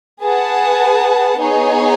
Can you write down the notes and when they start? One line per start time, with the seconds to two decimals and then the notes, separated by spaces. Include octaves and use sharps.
0.21 G#4 B4 F#5 A5
1.39 B3 D#4 G#4 C#5